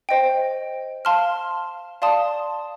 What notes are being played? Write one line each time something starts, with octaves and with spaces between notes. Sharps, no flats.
C5 D#5 G5
F5 A5 C6 F6
D5 F5 A5 C6 D#6